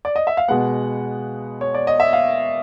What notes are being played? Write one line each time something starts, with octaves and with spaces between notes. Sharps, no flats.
D5
D#5
E5
F5
B2 G#3 B3 F#5
C#5
D5
D#5
E5
F5